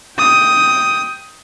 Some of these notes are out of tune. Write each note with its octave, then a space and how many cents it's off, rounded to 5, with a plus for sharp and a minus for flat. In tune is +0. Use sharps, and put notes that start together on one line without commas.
G5 +0 D#6 +10